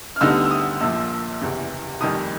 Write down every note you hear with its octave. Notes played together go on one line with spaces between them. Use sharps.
F6
D2 D3 G3 B3 D#4 E6
E6
D#6
A#1 A#2 F3 E6
F#1 E2 C3 E3
F1 F2 C3 D#3 G3 D#6